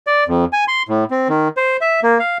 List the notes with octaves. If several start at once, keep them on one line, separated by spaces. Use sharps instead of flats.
D5
F2
G#5
C6
A2
C4
D#3
C5
E5
A#3
F5